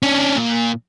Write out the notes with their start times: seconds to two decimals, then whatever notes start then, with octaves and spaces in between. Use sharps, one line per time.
0.03 C#4 D4
0.36 A#2